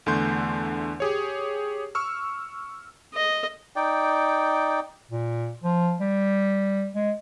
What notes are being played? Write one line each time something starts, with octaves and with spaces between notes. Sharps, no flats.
E2 D3 A3 C6 G6
G4 G#4 C#5
C#6 E6 F6
D#5
D#4 D5 G5
A#2
F3
G3
G#3